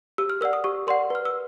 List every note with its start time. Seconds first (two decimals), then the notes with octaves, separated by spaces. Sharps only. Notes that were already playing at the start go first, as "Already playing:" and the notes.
0.18 G4 E6
0.30 F6
0.41 A#4 D5 F#5 E6
0.53 D#6
0.64 G4 C#6
0.87 A#4 D5 F#5 C6
1.10 B4 F6
1.25 E6